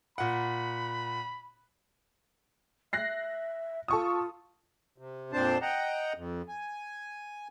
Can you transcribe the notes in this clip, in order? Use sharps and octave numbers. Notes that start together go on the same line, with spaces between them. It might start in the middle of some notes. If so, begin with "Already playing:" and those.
A#2 F#5 B5
E5 F#6 A#6 C7
F4 A4 C#6 D#6
C3
F2 A#2 C4 D4 C5 A5
D#5 F#5 G5 A#5
F2
G#5